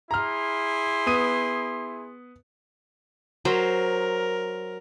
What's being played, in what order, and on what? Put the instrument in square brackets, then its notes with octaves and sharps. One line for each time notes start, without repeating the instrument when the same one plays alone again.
[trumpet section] E4 G#4 C6 [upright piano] A#5 F6
[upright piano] B3 D#6 D#7
[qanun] F#3 C5 [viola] A#4